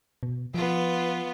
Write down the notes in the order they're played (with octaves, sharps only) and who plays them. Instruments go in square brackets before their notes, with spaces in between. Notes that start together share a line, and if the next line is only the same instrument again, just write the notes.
[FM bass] B2
[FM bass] F3 [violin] B3 F4